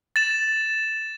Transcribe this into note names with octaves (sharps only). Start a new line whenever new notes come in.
A6 E7